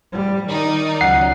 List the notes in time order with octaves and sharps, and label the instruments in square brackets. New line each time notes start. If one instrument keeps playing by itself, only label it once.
[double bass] G3
[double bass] D#3 [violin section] D#4 D5
[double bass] C#2 F#3 [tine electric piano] F#5 C7